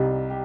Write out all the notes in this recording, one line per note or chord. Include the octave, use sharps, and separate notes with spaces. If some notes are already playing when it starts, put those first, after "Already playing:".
Already playing: C2 C3 G3 D#4
G4